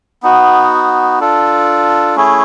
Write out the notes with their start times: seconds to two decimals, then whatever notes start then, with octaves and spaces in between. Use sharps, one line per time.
0.23 B3 D#4 F#4
1.20 D4 F4 A4
2.16 A3 C#4 E4 G#4